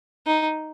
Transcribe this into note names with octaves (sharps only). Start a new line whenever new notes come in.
D#4